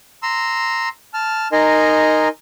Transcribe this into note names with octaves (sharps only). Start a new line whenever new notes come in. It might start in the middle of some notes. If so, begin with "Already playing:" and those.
A#5 C6 E6
A5 F6
D#4 A#4 D#5 G#5 A#5 C6